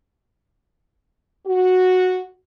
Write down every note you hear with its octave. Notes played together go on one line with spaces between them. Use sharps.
F#4